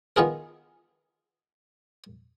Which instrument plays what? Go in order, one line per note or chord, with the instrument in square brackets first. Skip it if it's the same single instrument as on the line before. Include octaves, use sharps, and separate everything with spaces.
[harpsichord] D#3 B3 F4 G#4 A#4